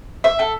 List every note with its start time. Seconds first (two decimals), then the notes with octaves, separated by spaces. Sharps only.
0.24 E5
0.39 A4